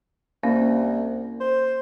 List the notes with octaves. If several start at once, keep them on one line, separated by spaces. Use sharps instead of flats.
C2 A#3 C#4 F5
C5